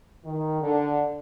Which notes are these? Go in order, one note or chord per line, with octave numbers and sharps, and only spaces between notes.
D#3
D3